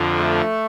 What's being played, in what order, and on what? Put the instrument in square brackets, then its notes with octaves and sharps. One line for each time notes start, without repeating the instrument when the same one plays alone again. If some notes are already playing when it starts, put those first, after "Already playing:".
Already playing: [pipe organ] F2 D3 F3
[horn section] A3